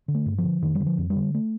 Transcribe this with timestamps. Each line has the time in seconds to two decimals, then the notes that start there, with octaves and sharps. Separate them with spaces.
0.08 D3
0.15 A3
0.26 G2
0.38 F3
0.44 D3
0.62 F2 D#3
0.75 G3
0.80 D3
0.86 F3
0.98 F2
1.10 G3
1.16 D3
1.34 A3